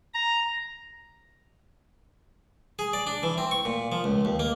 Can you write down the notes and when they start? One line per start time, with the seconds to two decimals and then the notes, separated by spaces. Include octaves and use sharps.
0.14 A#5
2.79 G#4
2.93 D5
3.07 D4
3.23 E3
3.38 C4
3.51 C#6
3.65 A#2
3.92 F3
4.04 C#2
4.25 D#2
4.40 A#3